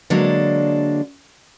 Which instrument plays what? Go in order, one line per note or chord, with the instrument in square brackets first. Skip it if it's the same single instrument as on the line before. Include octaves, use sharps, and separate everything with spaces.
[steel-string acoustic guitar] D3 F#3 G#3 A#3 D4